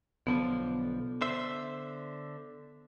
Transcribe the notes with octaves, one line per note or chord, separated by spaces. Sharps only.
B1 D3 F3 B3
D3 C5 E5